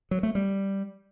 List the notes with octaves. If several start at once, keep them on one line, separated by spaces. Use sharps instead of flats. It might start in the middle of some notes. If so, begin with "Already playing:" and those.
F#3
A3
G3